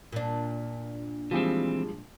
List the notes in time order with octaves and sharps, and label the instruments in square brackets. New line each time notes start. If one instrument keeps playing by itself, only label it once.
[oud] A#2 D4
[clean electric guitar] E3 C4 [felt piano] F3 G3 G#3